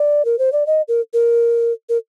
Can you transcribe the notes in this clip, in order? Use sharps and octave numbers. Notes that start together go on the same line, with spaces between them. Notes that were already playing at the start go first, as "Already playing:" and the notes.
Already playing: D5
A#4
C5
D5
D#5
A#4
A#4
A#4